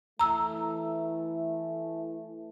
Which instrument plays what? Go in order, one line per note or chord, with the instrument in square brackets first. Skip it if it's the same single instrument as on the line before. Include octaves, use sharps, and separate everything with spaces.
[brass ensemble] E3 A3 [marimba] A#5 E6